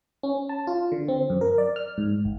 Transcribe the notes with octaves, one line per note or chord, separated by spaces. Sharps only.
C#4
A5
F4
D3
C4
F#2
A#4
D5
F6
G#2
G1